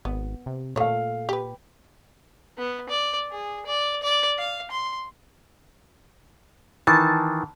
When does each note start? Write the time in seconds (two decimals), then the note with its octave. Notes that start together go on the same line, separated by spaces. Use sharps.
0.05 G#1 B3
0.46 C3
0.76 A#2 A3 A4 C#5 F5
1.29 G4 B4
2.58 B3
2.89 D5
3.31 G#4
3.66 D5
4.03 D5
4.38 F5
4.71 C6
6.87 D#3 E3 A5